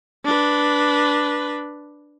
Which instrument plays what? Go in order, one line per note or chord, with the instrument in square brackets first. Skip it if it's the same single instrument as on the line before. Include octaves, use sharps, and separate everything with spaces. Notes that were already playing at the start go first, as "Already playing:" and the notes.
[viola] D4 B4